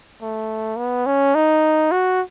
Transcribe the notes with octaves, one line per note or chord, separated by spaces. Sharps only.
A3
B3
C#4
D#4
F#4